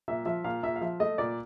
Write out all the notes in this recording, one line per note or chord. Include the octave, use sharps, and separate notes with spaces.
A#2 E5
F3 E5
A#2 F5
A#2 E5
F5
F3 E5
A3 D#5
A#2 D5